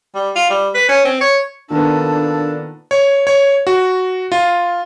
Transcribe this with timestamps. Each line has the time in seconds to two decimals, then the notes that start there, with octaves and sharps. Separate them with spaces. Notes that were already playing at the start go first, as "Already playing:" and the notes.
0.15 G3
0.36 F4
0.50 G3
0.75 B4
0.89 C#4
1.05 C4
1.21 C#5
1.71 A#2 D#3 B3 D4 A4
2.91 C#5
3.27 C#5
3.67 F#4
4.32 F4